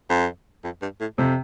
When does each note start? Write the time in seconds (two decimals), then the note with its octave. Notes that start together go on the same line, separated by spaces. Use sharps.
0.10 F2
0.64 F2
0.82 G2
1.00 A2
1.18 F2 C3